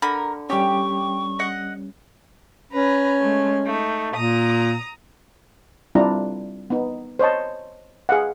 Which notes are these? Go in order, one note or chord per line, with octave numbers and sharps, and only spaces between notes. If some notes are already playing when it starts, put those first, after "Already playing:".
D3 A#4 B5
G3 C#4 G4 C#6
D#5 F#5
C#4 B4 A#5
G#3 A3
A3 D#4
A#2 A#5 D#6
G3 C4 D4 E4 F4 A#5
B3 D#4
C5 C#5 D#5 A5
G#4 F5 F#5